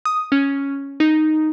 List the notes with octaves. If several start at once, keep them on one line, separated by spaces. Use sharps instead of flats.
D#6
C#4
D#4